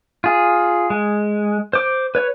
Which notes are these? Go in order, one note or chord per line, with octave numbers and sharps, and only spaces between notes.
F4 G#4
G#3
C5 D6
B4 C#5